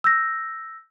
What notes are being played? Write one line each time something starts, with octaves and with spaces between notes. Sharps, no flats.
E6 G6 A#6